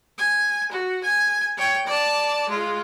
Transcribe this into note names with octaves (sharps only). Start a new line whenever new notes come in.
G#5
F#4
G#5
C#5 G5
D5 A5
G#3 F4